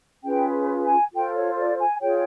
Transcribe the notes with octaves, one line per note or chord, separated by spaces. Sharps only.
C#4 F4 G#4 B4 G5
G#5
F4 A4 C5 G5
C#5
D5
G#5
F4 G#4 C#5 G5